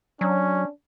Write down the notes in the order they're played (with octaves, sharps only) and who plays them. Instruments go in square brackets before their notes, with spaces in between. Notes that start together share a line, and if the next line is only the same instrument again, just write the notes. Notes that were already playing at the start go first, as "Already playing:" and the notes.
[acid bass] F#3 [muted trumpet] C#4 [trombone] D4